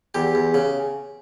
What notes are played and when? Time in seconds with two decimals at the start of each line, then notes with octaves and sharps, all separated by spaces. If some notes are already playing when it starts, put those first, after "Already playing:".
0.14 E2 G4
0.35 E2
0.54 C#3